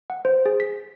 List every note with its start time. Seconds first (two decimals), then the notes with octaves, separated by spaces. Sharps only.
0.10 F#5
0.25 C5
0.46 G#4
0.60 B6